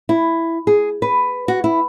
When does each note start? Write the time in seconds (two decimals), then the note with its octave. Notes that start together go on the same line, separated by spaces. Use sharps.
0.09 E4
0.67 G#4
1.02 B4
1.48 F#4
1.64 E4